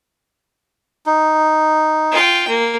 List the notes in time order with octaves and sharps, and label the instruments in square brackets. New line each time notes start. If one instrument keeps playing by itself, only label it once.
[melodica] D#4
[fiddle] F4 G5
A#3